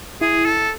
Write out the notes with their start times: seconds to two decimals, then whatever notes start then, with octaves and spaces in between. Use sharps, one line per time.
0.21 E4 G#4
0.46 A4